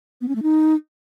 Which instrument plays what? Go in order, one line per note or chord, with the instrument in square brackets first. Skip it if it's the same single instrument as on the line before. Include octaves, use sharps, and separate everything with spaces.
[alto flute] B3
C#4
A3
D#4